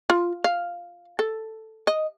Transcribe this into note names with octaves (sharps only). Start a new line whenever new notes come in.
F4
F5
A4
D#5